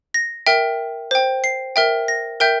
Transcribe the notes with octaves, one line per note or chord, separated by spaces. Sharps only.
A#6
A#4 E5 G5
C5 G5
C7
A#4 E5 G5
A#6
A#4 E5 G5 G6